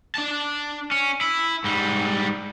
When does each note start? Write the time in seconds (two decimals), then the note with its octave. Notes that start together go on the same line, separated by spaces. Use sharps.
0.15 D4 A5
0.91 C#4
1.21 E4
1.64 G#2 G3